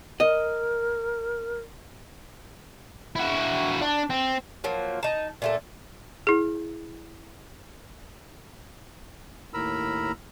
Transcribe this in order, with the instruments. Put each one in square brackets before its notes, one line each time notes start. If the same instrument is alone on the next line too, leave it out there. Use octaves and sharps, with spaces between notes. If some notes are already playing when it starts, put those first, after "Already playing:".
[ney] A#4 [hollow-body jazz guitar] D#5
[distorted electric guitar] E4 F#4
D4
C4
[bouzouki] F3 F#3 A#3
D#4 A5
A#2 A3 A4
[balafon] E4 G#4
[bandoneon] D#2 A2 A#4 A#5 B5 E6